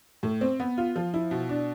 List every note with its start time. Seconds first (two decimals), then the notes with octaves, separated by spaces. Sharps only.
0.23 A2
0.41 C4
0.60 B3
0.78 F4
0.96 F3
1.14 E4
1.31 B2
1.49 D4